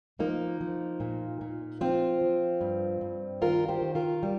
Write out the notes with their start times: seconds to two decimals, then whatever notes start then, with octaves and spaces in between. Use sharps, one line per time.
0.19 F3 A#3 D#4
0.61 F3
1.00 A#2
1.41 A#2
1.81 F3 C4 F4
2.21 F3
2.61 G2
3.01 G2
3.41 D#3 F4 A#4
3.68 G4 C5
3.81 D#3
3.95 F4 A#4
4.23 G3